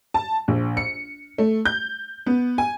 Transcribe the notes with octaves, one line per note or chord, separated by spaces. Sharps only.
A5
A#1
C#7
A3
G6
B3
G#5